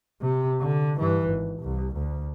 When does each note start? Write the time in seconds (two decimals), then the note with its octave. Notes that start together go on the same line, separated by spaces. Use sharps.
0.21 C3
0.61 D3
0.97 G2 E3
1.28 G#1
1.61 C2
1.95 D2